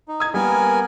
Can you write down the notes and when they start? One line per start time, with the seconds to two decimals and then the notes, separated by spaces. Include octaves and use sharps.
0.08 D#4
0.20 D#6 G#6
0.34 G3 A#3 B3 A#4 G#5